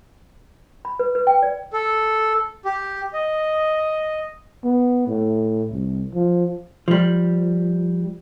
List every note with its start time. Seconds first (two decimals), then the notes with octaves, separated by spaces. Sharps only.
0.85 B5
0.99 B4
1.15 B4
1.27 G5
1.43 D5
1.73 A4
2.65 G4
3.13 D#5
4.64 B3
5.08 A2
5.72 C2
6.14 F3
6.88 F3 G3